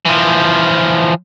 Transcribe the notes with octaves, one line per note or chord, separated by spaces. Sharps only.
E3 F3